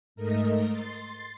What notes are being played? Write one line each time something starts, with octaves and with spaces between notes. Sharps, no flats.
G#2 A3 A#4 D#5
C6 A6